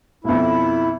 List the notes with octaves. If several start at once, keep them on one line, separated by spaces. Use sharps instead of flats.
B1 F2 E4